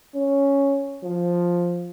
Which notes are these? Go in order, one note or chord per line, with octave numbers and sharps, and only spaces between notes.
C#4
F3